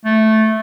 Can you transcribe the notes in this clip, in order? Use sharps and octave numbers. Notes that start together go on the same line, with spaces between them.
A3